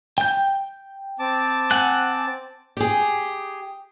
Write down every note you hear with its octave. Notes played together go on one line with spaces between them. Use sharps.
G5 G6
C4 A5 D6
F#5 G#5 F#6
G4 G#4